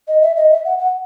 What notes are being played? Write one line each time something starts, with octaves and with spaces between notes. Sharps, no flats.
D#5
E5
D#5
E5
F#5
F#5